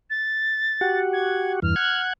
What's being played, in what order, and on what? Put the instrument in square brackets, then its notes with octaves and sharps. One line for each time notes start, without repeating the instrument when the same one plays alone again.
[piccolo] A6
[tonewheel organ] F#4 G4 F#5
[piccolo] G#6
[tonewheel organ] E2 G2 E3 [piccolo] F6
[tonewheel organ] F#5 F#6 G#6